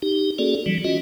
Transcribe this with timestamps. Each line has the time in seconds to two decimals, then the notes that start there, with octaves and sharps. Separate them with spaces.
0.02 D#4 G4
0.38 A#3 C#4 F#4 G#4 A4 D5
0.66 E3 F#3 G3
0.84 C#4 F4 F#4 D#5